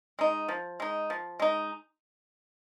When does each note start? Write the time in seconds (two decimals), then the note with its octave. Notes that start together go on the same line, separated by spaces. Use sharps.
0.19 G#3 D#4
0.48 F3
0.80 G#3 D#4
1.10 F3
1.40 G#3 D#4